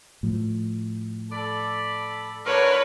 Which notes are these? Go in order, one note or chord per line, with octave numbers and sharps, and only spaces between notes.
A2 F3
A4 D5 B5
D3 A#4 B4 C#5